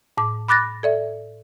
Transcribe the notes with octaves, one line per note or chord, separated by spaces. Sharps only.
A2 D6
B5 D6 F#6 A6 A#6
A4 D5 E5